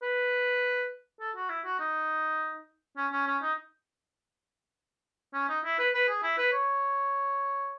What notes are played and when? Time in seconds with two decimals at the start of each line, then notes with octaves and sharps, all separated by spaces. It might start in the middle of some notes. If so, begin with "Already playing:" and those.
0.02 B4
1.21 A4
1.36 F#4
1.49 E4
1.65 F#4
1.80 D#4
2.97 C#4
3.13 C#4
3.27 C#4
3.42 D#4
5.34 C#4
5.49 D#4
5.65 E4
5.79 B4
5.94 B4
6.09 G#4
6.23 E4
6.38 B4
6.52 C#5